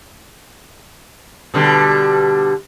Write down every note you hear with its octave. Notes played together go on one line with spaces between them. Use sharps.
B2 D3 G3